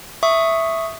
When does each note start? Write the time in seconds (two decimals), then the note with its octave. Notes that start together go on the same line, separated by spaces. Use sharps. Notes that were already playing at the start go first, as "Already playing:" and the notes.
0.23 E5 C#6 D#6